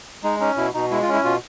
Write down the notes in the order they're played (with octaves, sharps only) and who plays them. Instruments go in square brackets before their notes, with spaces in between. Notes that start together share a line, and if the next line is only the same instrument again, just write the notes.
[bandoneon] G#3 D#4
C#4 D#4
B2 E4
B2 D#4
G#3 E4
F4
C#4
E4
B2 F4